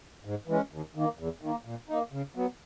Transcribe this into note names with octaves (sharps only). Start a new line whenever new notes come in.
G#2
E3 G#3 C#4
D#2
D#3 A#3
E2
D#3 A#3
A#2
A#3 D#4
C#3
F#3 B3